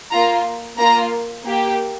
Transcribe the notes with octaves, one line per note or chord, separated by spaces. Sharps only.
A#3 F4 A#5
A#3 F4 A#5
A#3 G4